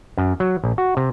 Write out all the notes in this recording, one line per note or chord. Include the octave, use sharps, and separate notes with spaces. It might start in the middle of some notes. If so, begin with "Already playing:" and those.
F#2
F#3
A#1
F#4
C3